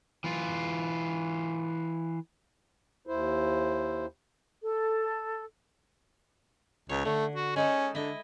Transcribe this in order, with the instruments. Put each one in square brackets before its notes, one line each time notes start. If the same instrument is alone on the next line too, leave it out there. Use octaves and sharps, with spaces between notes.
[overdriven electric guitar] E3 F4
[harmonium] D#2 E4 C5
[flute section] A4
[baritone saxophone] C#2 [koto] C#5
[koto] D3 [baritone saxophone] A3
[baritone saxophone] F#4
[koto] G#3 D#4 A4 [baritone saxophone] C#4
[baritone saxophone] D3 [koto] E4 D#5